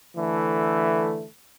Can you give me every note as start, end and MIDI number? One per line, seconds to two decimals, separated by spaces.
0.16 1.26 50
0.16 1.26 52
0.16 1.26 57